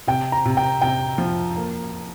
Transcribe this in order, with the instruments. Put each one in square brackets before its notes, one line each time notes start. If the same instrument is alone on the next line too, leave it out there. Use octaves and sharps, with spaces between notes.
[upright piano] C3 [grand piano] G5
[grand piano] A#5
[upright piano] C3
[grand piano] G5
[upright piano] C3 [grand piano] G5
[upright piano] F3
A#3